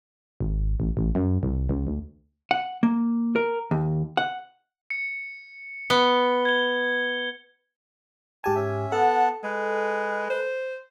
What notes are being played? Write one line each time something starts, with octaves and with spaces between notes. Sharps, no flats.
G#1
A1
A1
F#2
C2
C#2
D2
F#5
A#3
A#4
D#2
F#5
C#7
B3 G7
G#6 G7
G#2 G4 G#5 A5
C#4 E5
B3 A4 F#5 A5
G#3 B4
C5